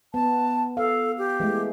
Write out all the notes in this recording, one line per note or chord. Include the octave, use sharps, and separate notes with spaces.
B3 A5
A4 F5
G4
E3 G#3 A3